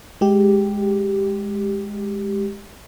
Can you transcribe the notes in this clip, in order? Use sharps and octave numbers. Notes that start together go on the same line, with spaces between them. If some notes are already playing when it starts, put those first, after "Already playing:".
G#3 G4